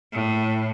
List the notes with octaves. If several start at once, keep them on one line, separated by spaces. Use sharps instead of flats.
A2